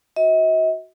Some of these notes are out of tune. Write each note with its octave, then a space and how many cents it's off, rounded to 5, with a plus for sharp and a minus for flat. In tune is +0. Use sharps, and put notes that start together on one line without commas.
F#4 +0 D#5 +45